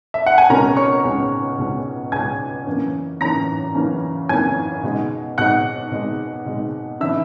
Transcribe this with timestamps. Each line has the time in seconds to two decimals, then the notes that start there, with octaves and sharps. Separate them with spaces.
0.14 E5
0.26 F#5
0.38 G#5
0.50 C#2 B2 G#3 C#4 A#4 A#5
0.77 C#5 C#6
1.04 C#2 B2 G#3 C#4
1.58 C#2 B2 G#3 C#4
2.12 C#2 B2 G#3 C#4 G#5 G#6
2.67 F#2 C#3 E3 A#3 C#4
3.21 F#2 C#3 E3 A#3 C#4 A#5 A#6
3.75 F#2 C#3 E3 A#3 C#4
4.29 F#2 C#3 E3 A#3 C#4 G#5 G#6
4.83 B2 G#3 D#4
5.38 B2 G#3 D#4 F#5 F#6
5.92 B2 G#3 D#4
6.46 B2 G#3 D#4
7.00 C#3 E3 B3 D#4 E5 E6